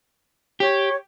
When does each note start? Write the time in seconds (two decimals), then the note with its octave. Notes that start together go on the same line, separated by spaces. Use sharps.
0.60 G4 C#5